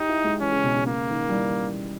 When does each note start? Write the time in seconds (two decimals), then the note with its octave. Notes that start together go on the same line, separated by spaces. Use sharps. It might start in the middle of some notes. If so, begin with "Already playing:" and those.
Already playing: D#4 G4
0.09 E4
0.24 G#3
0.41 E3 C#4
0.52 C#3
0.63 B2
0.74 C#3
0.87 C#3 A#3
1.10 D#3
1.29 G3
1.33 E3